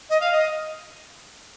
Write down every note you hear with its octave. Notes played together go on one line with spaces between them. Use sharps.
D#5
F5
D#5